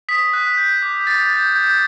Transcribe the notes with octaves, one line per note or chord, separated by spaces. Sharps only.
D#6 B6
F#6
G6
D6
D6 A6
G6
G6